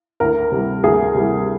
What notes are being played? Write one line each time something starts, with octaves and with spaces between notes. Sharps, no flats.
D2 A#4
C3 G3
D2 G#4
C3 G3